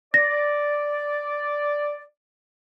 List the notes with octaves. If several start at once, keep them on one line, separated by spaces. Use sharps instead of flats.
D5 A#6